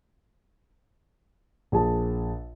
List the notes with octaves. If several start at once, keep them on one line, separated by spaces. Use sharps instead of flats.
A#1 G#4 A5